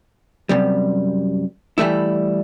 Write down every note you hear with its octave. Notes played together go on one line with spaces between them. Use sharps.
F#2 C3 G3
E3 G3 A3 E4